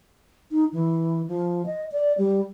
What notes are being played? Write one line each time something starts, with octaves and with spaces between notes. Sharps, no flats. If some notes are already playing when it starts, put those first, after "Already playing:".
D#4
E3
F3
D#5
D5
G3